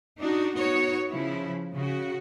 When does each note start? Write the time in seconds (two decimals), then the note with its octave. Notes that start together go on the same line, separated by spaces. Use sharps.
0.20 D4 D#4 F#4
0.55 B3 D#4 F#4 C#5
1.09 C#3 F3 E4
1.74 C#3 F#4